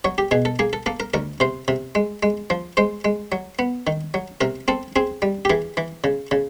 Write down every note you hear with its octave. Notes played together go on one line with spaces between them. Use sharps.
F#3 C#5
G4
B2 G#4
A4
A#3 G#4
A4
A#3 A4
A#4
D2 A#4
C3 C5
C3
G#3
G#3
F3
G#3 C5
G#3
F#3
B3
D#3
F#3
C3 A#4
C4 A4
C4 G#4
G3
G4
E3 G#4
E3
C#3
C#3